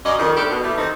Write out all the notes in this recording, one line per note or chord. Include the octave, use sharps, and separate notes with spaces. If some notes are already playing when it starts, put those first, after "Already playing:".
F#2 D5 D#5
F2 D#3
G3 A3 D4 G4 A4
B2
E3 G3 A3
D#3 C4 D#4